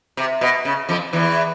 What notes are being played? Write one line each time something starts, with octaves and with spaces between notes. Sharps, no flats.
C3
B2
C#3
F2 F3
E2 E3